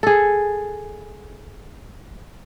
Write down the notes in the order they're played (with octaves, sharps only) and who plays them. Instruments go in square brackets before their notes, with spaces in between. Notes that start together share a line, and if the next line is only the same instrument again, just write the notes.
[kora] G#4 A4